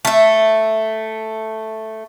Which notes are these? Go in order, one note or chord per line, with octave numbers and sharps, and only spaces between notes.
A3 E5